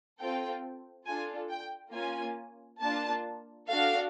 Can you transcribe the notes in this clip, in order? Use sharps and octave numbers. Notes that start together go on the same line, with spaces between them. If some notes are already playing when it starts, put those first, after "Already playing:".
C4 F4 A4 G5
D4 F4 A4 G#5
G5
A#3 C#4 F4 G#5
A#3 D4 F4 A5
D4 F#4 A4 F5